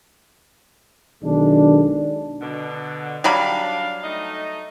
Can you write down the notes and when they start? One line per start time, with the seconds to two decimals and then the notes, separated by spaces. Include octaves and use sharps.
1.23 B1 D#3 G#3 D4
2.41 B2 D3
3.24 F#3 G3 D4 F5 B5
4.03 A3 D#4 D#5